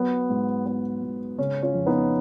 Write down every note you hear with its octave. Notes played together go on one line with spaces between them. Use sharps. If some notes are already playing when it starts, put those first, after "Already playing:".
Already playing: F#3 B3
G#2
B3
G#2
C#3 C#4
C#4 F4
F2
B3 D#4